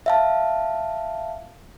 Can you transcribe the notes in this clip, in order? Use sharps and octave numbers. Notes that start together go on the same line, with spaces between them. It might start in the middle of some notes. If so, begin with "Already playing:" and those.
E5 F5 A5